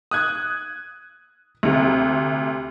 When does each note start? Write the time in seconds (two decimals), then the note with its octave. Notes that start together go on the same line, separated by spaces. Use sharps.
0.11 D#6 F#6 G#6
1.63 D2 C3